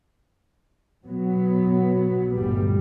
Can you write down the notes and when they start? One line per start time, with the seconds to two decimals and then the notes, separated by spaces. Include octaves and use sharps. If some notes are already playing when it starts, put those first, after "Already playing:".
1.05 B1 F#3 B3
2.35 G1 D2 A#2 G3